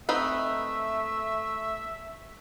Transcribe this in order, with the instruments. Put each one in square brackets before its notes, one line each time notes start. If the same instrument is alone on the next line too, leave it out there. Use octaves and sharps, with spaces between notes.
[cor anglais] A3 [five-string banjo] C4 D#4 B4 [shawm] E5